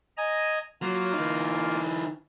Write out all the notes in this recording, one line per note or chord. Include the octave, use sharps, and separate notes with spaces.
D#5 G#5 A#5
F#3 A#3 F4
E3 D#4